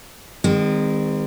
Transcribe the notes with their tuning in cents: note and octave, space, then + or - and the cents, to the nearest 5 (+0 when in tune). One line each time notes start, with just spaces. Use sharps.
D#3 +0 G#3 -45 C4 -25